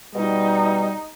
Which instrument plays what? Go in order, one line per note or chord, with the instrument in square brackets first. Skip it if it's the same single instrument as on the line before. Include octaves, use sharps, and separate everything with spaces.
[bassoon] B2 [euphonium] G3 [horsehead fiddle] D#4